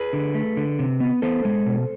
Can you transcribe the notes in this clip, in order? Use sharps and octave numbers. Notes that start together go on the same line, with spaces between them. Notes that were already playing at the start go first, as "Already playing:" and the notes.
Already playing: G#4 B4
D3
A3
D3
C3
B3
B3 A4 C5
G#3
B2